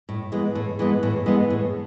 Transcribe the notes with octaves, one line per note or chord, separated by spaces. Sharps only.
A2
E3 G#3 B3
A2
E3 G#3 B3
A2
E3 G#3 B3
A2